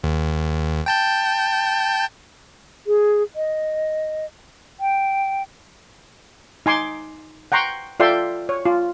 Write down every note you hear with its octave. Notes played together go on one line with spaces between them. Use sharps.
D#2
G5 A5 G6
G#4
D#5
G5
D#4 G#5 C6 D6
F#5 G5 A#5 C6 C#6
F4 A4 D5 E5 G5 C6
C#5
F4